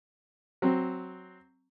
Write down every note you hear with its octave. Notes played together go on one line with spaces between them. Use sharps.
F#3 C4